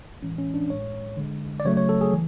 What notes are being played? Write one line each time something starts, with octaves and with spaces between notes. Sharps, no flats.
A2 E3 G#3 C#4
C#4
D4
A2 G#3 C#5
D3 G#3
D5
C#3 F#3 A3 C#5
C#5
A4
G#4
E3